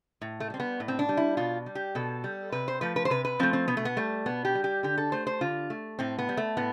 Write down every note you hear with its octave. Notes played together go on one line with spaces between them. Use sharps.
A2
A3
G3 C4
B3
A2
C4
D4
G3
E4
B2 F4
G3
G4
B2 A4
G3
C3 B4
C5
F3 A3 B4
B4
C5
C3 B4
B4
F3 A3 C4
C4
B2 B3
A3
B3
G3 A3
B2 B3
G4
G3
G4
D3 G4
A4
A3 C5
C5
D3 F4
A3
A2 C4
B3
G3
A3
A2 B3